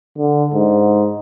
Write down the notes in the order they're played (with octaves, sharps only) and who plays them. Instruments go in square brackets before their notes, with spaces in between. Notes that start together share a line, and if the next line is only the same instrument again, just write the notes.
[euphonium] D3
G#2